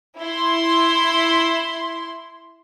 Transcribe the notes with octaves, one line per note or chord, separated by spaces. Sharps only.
E4 C6